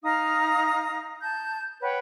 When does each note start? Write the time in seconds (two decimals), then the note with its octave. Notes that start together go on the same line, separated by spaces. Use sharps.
0.03 D#4 F5 A#5 D#6
1.23 A5 G6
1.82 B4 C#5 F#5 G5